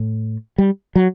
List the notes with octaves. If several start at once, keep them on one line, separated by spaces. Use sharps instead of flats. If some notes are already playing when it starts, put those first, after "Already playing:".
Already playing: A2
G3
F#3